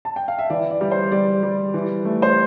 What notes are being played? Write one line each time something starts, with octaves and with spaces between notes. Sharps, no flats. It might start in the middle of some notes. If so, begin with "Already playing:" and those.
A5
G5
F5
E5
E3 D5
D5
G3
C5
G3 D5
G3
E3
A3
C5